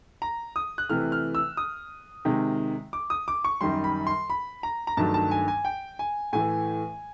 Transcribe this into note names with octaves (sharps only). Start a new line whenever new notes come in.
A#5
D#6
F#6
C3 E3 A3 F6
F6
E6
D#6
C3 D#3 G#3
D6
D#6
D6
C#6
F#2 D#3 G3 C6
B5
C6
B5
A#5
A#5
G2 D#3 F#3 A3 A5
A5
G#5
G#5
G5
G#5
A2 E3 A3 G#5